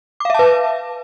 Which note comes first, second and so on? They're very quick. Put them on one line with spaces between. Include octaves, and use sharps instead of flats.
D6 F5 E5 A5 B4